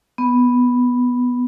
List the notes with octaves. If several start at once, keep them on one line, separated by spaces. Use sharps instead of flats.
B3